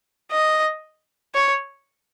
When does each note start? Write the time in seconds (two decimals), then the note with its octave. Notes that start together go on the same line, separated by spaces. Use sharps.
0.31 D#5
1.35 C#5